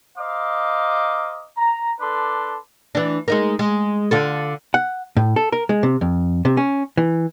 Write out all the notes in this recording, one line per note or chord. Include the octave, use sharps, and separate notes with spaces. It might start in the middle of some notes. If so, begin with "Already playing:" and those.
C5 D#5 F5 A#5 D6
A#5
D4 A4 B4 C6 D6
E3 D4
G#3 D#4 A#4
G#3
D3 F4 A4
F#5
A2
A4
A#4
G#3
C3
F2
C3
C#4
E3